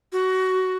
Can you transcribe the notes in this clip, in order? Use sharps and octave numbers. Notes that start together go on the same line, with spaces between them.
F#4